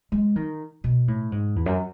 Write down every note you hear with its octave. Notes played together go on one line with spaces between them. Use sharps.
G#3
D#3
B2
A2
G#2
E2
F#2